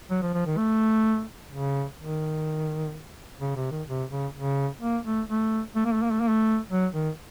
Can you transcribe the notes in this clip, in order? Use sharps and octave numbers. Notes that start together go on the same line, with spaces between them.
F#3
F3
F3
D#3
A3
C#3
D#3
C#3
C3
D#3
C3
C#3
C#3
A#3
A3
A3
A3
A#3
A3
A#3
A3
A#3
A3
F#3
D#3